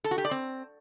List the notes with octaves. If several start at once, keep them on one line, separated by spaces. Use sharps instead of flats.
A4
F#4
G4
D5
C4